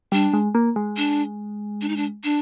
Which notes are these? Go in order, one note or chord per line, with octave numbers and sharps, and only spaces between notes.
G3 D4
G#3
A#3
G#3
D4
D4
D#4
D4
D4